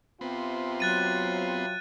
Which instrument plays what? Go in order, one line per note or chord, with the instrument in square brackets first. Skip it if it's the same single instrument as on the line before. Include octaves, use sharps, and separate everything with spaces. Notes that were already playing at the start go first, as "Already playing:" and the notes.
[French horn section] C3 F4 [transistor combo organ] B3 C4
[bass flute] F#3 [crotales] F#6 A6 D#7